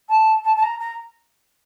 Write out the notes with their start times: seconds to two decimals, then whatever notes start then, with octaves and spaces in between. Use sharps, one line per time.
0.09 A5
0.44 A5
0.57 A5
0.63 A#5
0.80 A#5